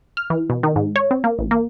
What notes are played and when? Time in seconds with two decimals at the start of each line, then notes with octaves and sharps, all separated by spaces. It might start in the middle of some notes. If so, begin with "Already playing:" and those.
0.17 F6
0.30 E3
0.50 B2
0.63 D#3
0.76 G#2
0.96 C#5
1.11 C4
1.24 A#3
1.39 A1
1.51 A#3